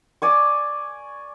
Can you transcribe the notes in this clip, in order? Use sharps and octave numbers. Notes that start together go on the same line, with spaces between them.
D5 G#5 C#6